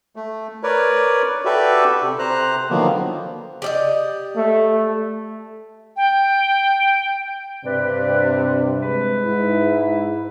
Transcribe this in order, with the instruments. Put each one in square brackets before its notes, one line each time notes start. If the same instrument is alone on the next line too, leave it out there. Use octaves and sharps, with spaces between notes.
[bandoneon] A3
A#4 B4 C#5 D5
F#4 G4 A4 B4 D5 E5
C3
C3 C5 A#5 F#6
D3 D#3 F3 F#3 A#3 B3
[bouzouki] G4 D5 D#5
[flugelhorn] A3
[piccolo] G5
[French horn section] G2 C3 [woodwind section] B4 D5
[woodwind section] G#3 G#4 B4
[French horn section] G#2 E4